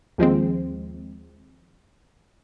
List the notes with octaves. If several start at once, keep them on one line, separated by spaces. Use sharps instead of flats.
D#2 F3 G#3 C4